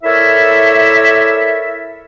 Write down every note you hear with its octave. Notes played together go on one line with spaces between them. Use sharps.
E4 A4 A#4 C#5 D5 E5